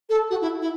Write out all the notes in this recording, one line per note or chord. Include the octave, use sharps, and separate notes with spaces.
A4
F#4
E4
E4